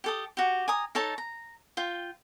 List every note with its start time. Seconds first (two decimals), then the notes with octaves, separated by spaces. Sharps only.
0.04 G4 A4 D#6
0.37 F#4 G4
0.68 G#5 A#5 D#6
0.95 D#4 A4 C#5 A5
1.18 A#5
1.77 F4 G5